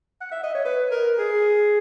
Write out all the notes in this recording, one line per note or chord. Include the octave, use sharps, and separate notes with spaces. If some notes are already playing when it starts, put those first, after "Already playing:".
F#5
E5
D#5
C#5
B4
A#4
G#4